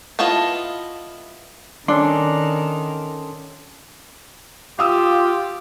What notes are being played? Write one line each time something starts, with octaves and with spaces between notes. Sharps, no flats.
B3 E4 F4 A4 D#5
D#3 C#4 D4 A4 C6
F4 G4 F5 D#6 E6